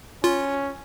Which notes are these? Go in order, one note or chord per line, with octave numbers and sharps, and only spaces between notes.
C#4 F4